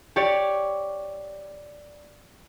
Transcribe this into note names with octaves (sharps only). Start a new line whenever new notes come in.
G4 C#5 D5